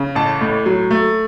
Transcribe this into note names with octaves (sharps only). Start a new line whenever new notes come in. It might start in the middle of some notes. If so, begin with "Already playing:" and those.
Already playing: C#3
A1 A5
A2
F#3
A3